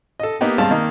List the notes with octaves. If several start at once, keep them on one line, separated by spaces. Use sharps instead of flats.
A4 D#5
A#3 B3 D#4 G4
G2 G#3 C4 F5 A5
D#3 A#3 D#4